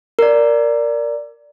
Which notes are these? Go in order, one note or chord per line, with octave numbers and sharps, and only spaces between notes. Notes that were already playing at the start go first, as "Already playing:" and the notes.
A#4 D5